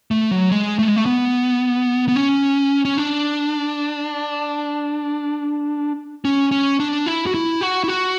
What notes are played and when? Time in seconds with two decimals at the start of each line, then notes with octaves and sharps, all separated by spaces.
0.11 A3
0.31 F#3
0.51 G#3
0.79 A3
0.88 G#3
0.96 A3
1.06 B3
2.08 B3
2.15 C#4
2.85 C#4
2.97 D4
6.25 C#4
6.51 C#4
6.80 D4
7.06 E4
7.27 F#4
7.34 E4
7.61 F#4
7.84 E4
7.88 F#4